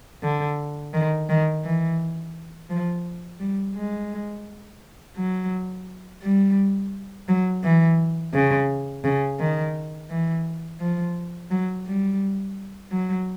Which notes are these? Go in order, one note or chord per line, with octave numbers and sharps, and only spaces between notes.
D3
D#3
D#3
E3
F3
G3
G#3
F#3
G3
F#3
E3
C#3
C#3
D#3
E3
F3
F#3
G3
F#3